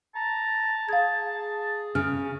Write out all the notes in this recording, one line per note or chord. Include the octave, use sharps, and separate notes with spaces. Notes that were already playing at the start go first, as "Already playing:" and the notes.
A5 A#5
G#4 F5 G#6
C#3 F6